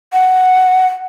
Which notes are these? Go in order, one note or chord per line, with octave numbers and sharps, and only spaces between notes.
F#5